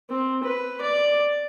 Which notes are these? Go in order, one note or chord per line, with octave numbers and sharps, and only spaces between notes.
C4
B4
D5